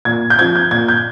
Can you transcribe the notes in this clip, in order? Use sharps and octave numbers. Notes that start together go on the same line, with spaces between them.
A#2 G#6
G6
F3 C4 G#6
G6
A#2 G#6
G6